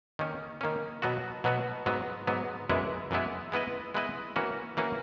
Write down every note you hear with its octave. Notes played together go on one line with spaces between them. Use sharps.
D#3 A#3 C#4
D#3 A#3 C#4
B2 F#3 B3 F#4
B2 F#3 B3 F#4
G#2 F#3 B3
G#2 F#3 B3
F#2 E3 G#3 B3 E4
F#2 E3 G#3 B3 E4
G#3 B3 E4 B4 D#5
G#3 B3 E4 B4 D#5
E3 A#3 C#4 F#4
E3 A#3 C#4 F#4